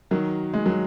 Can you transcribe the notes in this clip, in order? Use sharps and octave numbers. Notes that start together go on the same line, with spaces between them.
D#3 F#3
G#3
F#3